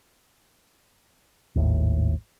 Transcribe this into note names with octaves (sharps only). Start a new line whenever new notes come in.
G#1 D#2 A2